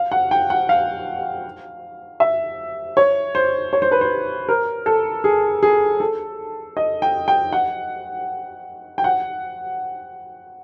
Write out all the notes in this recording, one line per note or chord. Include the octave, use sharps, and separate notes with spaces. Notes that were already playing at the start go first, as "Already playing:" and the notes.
Already playing: F5
F#5
G5
F#5
F5
E5
C#5
C5
C#5
C5
B4
C5
A#4
A4
G#4
G#4
A4
D#5
G5
G5
F#5
G5
F#5